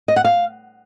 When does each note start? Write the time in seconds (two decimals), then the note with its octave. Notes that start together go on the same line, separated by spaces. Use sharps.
0.08 D#5
0.16 F#5
0.24 F5